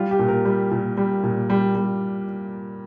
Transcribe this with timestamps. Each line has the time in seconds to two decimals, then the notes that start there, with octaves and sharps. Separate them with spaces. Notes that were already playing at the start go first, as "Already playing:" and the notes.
Already playing: G3 F4
0.11 G4
0.19 A#2
0.28 A#4
0.45 G3
0.71 A#2
0.97 G3
1.23 A#2
1.50 G3
1.75 G3